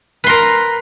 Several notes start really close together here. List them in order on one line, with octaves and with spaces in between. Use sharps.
B4 C6 A#4